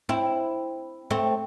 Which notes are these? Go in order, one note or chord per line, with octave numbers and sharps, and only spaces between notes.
C4 E4
A3 C4